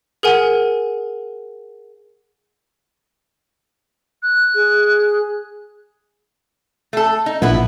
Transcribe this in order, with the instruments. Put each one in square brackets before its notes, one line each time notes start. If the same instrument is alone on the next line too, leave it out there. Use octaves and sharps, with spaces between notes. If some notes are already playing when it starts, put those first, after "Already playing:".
[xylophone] G#4 A#4 F#5 G#5
[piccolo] F#6
[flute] G#4
[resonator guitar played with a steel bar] A3 A4
D#4
[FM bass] A#1 [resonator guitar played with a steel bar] B3 E4 B4